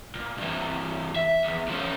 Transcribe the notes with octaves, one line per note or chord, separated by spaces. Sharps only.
A#2
G2 E3
E5
B1 E2
F3 C#4